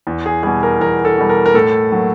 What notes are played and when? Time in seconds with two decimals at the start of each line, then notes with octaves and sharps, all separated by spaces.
0.07 E2
0.26 G#4
0.43 B2 G3 G#4
0.63 A#4
0.80 E2 A#4
1.05 A4
1.18 B2 G3
1.29 A#4
1.46 A#4
1.54 A2 A4
1.92 F#3 A#3